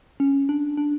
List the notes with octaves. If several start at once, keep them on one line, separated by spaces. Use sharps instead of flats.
C#4
D4
D4